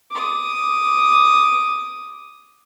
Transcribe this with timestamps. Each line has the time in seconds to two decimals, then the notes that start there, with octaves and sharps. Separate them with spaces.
0.11 D6 D#6